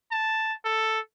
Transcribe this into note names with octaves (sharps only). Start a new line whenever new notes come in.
A5
A4